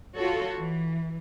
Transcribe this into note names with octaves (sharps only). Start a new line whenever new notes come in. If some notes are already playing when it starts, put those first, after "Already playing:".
F4 F#4 A4 C#5
E3